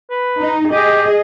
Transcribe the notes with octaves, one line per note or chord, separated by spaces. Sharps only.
B4
D#4
G4 G#4 D#5